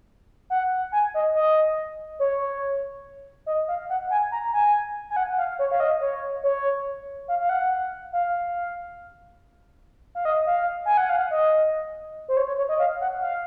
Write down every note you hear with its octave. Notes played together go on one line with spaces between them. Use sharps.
F#5
G#5
D#5
D#5
C#5
D#5
F5
F#5
G#5
A#5
G#5
G#5
F#5
F5
C#5
F5
D#5
C#5
C#5
F5
F5
F#5
F5
F5
D#5
F5
G#5
F#5
F5
D#5
C5
C#5
C#5
C#5
D#5
F5
F#5
F5